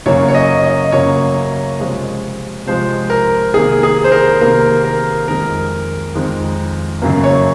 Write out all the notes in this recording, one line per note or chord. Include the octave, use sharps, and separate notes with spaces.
F#2 C#3 F#3 A#3 C#5
C#5
D#5
D#5
F#2 C#3 F#3 A#3 C#5
C3 F3 G#3
C3 F3 G#3 C5
A#4
C3 D#3 A#3 G#4
G#4
C5
A#4
C3 D#3 A#3 A#4
A#4
F2 D#3 G#3 A#4
F2 D#3 G#3
F#2 C#3 F#3 A#3
C#5